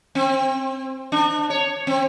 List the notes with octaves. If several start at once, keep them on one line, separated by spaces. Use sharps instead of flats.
C4
D4
C#5
C4